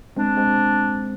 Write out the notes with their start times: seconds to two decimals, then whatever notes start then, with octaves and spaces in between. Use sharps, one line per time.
0.16 G#3 C4 D4
0.37 G#3 C4